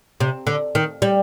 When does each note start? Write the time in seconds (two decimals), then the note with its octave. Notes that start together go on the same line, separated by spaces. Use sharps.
0.20 C3
0.47 D3
0.75 D#3
1.02 G3